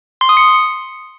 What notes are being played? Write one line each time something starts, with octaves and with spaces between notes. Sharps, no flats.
C6
D#6
C#7